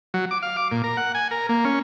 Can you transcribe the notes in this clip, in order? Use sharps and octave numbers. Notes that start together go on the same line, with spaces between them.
F#3
D6
F5
D6
A#2
A#4
F#5
G#5
A#4
A#3
C#4